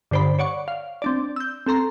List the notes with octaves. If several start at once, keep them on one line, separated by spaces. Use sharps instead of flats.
G2 D3 C5 D5 B5
C#5 D5 F#5 C#6
F5
C4 D4 D5
E6 G6
C4 A4 A#5 C6